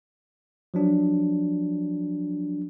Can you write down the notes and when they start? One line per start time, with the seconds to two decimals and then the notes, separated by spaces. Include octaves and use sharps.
0.74 F3 F#3 D4